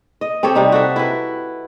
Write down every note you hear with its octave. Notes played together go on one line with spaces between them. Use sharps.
D#5
C4 G4 A4 C#5
C3 G3 D#4
F#4 A4 E5
E4 B4